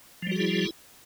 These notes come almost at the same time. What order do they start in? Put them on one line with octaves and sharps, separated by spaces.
F3 G3 F#4 G#4 E4